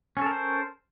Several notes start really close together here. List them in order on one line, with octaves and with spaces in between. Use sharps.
C#4 A4 A#4 C5